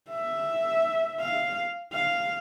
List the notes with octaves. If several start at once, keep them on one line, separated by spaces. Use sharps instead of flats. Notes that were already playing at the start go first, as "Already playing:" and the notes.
E5
F5
F5